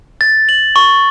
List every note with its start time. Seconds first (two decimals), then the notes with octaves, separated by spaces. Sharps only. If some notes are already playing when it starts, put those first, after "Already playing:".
0.21 A6
0.49 F#7
0.76 C#6